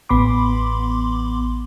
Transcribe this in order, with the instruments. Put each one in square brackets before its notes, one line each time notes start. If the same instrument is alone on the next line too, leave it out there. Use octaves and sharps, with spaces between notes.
[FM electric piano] A1 B3 B5 C6 D6